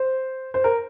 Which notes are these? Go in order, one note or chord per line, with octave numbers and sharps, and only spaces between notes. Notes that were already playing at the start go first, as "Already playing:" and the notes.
Already playing: C5
C5
A#4